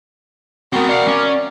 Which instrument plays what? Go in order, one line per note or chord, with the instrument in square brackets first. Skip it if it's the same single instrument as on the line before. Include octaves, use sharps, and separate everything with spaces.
[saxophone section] B2 F#4 A#4 [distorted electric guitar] B3 C4
[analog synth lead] D5 [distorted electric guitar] F5 F#5
[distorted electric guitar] C#4